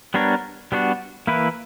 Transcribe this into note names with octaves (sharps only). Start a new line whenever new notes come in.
G3 B3 D4 A#4 C#5
G3 B3 D4 F#4
E3 A#3 E4 B4